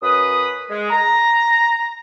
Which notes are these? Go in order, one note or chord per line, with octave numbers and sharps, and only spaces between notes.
F#2 B4 D#6
G#3
A#5